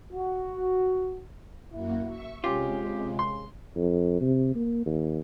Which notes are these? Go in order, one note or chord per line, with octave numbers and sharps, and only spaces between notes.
F#4
F#2 A#3 E4 F#4
E5 C#6
C3 G#3 C#4 F4 G4
C#3
C6
F2
C3
A#3
D#2